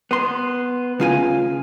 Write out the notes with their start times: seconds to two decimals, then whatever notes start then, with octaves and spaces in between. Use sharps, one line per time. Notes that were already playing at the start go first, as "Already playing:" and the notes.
0.11 B3 C6
1.00 C#3 A3 F4 F5 G#5